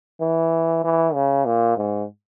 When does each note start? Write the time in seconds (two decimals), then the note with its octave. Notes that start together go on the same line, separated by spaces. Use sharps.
0.21 E3
0.84 E3
1.14 C#3
1.46 A#2
1.77 G#2